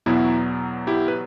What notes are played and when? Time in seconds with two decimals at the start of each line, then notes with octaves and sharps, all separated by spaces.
0.06 E2 B2 F#3 B3 E4
0.87 E4 G4
1.08 B4